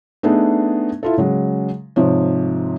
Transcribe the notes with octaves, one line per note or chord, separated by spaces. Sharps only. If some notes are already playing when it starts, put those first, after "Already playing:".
A3 B3 D4 D#4 G#4
E4 F4 A4
C#3 F#3 G#3
G#2 C3 F3 C#5